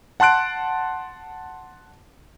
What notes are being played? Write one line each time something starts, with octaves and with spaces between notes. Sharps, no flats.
F#5 A5 C6 F#6 D7